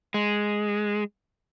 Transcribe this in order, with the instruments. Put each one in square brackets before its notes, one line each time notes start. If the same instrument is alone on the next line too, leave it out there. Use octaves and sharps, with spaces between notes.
[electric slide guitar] G#3